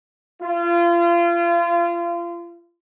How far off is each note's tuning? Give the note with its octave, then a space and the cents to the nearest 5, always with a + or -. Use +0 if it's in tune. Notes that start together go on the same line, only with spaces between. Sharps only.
F4 -30